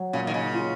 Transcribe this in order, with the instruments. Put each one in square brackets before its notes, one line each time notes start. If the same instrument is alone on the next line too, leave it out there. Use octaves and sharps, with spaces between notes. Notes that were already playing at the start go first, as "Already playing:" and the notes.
Already playing: [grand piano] F#3
[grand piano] A#2 [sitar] C#3
[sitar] D#3
C#3
[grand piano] F4